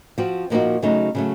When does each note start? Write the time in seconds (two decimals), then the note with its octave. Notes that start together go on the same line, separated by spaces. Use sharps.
0.18 F3 C4 F#4
0.50 A#2 F3 A#3 D#4 F#4
0.82 C#3 F#3 A3 D#4
1.15 C#3 F#3 A3